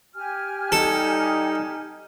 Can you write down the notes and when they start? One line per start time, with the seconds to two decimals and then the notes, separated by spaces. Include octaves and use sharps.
0.15 G4 G#5 F6
0.72 G3 D#4 A4